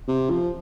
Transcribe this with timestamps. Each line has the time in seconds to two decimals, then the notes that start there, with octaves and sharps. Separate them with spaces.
0.08 C3
0.30 F3